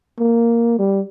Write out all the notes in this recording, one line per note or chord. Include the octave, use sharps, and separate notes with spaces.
A#3
G3